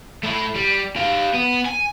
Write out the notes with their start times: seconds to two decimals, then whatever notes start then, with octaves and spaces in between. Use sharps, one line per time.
0.23 A3 E4
0.55 G3
0.96 G4 F5
1.34 B3
1.66 G#5